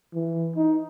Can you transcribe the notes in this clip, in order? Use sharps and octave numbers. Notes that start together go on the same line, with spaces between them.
E3
D#4